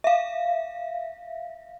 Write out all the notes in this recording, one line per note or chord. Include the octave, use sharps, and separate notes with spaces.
E5 F5